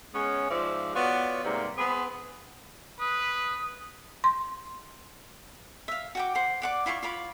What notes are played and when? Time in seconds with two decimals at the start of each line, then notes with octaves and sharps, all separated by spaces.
0.14 G#3 B3 C#4
0.50 G#2 F3 D5 E5 F5
0.94 B3 F4 F#4 C#5 D5
1.44 G#2 C3 G3 A#3
1.77 B3 C4 G#4 B5
3.00 B4 D#6
4.24 C6
5.88 E5 F5
6.15 F#4 G5 D6
6.35 C5 F#5
6.62 D5 F#5 D6
6.86 E4 F4 G5 C#6
7.02 F4 C#5 B5 D6